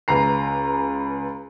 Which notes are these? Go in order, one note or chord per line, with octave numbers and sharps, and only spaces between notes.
C#2 B4 A#5 C7